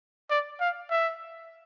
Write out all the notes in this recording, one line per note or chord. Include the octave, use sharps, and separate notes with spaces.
D5
F5
E5